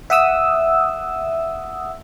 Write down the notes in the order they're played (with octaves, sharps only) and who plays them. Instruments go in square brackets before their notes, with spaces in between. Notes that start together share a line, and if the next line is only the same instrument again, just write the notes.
[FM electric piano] E5 F#5 D#6 E6